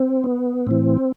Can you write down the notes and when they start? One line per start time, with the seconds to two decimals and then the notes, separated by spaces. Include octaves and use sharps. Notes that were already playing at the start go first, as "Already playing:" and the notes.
Already playing: C4
0.24 B3
0.67 A2 E3 C4